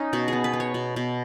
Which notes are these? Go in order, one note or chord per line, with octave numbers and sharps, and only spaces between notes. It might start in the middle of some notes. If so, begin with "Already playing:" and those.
Already playing: C#4 D#4
B2 F#4
B3 G#4
B4
B3
C#5
B2
B2